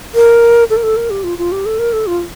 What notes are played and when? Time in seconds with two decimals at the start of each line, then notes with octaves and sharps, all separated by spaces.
0.15 A#4
0.70 A4
0.77 A#4
0.83 A4
0.97 A#4
1.10 G4
1.24 F4
1.38 F4
1.52 G4
1.66 A4
1.79 A#4
1.93 A4
2.07 F4